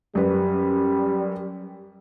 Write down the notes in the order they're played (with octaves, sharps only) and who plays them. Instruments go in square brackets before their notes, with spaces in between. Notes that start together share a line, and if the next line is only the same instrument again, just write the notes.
[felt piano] F#2 B4 [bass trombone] G3